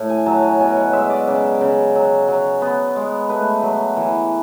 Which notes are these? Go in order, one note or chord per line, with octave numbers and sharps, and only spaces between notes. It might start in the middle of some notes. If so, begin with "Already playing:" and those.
Already playing: A2
G#5
F#3 A5
G#5
B2 G#5
F#5
G#3 E5
D5
C#3 D5
C#3
F#3
F#3
B3
G#3
A3 B4
F#3
E3